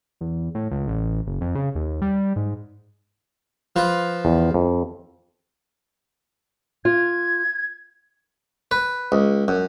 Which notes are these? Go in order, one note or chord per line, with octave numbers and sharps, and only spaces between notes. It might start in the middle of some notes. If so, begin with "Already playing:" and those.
E2
A2
C#2
A1
F#1
F2
C#3
D#2
G3
G#2
F3 F4 B4
E2
F2
F4 G#6
B4
C#2
F#2